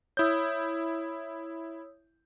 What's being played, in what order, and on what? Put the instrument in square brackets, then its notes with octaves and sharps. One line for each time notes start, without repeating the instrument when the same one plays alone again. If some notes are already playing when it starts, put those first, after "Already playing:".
[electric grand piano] E4 G6 [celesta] C#5 D#6 E6